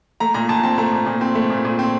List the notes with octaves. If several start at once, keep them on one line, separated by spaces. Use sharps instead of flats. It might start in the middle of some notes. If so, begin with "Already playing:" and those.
A3 A#5
A#2 A#5
A#2 A5
C4 A5
A3 A#5
A#2
A#2
C4
A3
A#2
A#2
C4